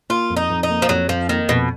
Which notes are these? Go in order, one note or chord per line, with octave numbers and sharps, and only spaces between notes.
A#3 F4
F2
D#4
F2
D#4
A#3
F3
F2 F#3
F2 F3
D#3 A#3
F2 B2